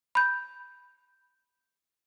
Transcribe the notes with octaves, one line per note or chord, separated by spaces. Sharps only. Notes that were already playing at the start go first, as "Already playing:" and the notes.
B5 G6